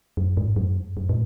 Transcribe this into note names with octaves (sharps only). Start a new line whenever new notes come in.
F#2
G#2
F#2
F#2
A2